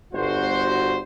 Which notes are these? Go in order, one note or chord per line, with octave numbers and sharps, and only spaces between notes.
G1 F#4 C5